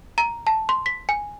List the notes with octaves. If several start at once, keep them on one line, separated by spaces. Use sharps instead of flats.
A#5
A5
C6
B6
G#5